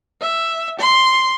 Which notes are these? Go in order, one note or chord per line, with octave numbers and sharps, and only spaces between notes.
E5
C6